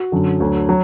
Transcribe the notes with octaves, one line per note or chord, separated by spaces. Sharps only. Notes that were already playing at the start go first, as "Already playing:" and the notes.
Already playing: F#4
F#2 D3 F#3
D2 D3 F#3
F#3